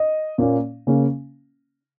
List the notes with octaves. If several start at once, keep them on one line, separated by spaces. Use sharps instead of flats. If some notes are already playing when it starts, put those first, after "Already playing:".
Already playing: D#5
A#2 A#3 C#4
C#3 A#3 C#4